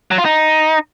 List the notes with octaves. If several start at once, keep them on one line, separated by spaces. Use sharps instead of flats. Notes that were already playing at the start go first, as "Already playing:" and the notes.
F#3
F4
D#4